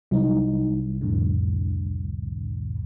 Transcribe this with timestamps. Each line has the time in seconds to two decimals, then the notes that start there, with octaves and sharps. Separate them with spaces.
0.11 C2 F#3 D#4
1.01 F2 A2 D3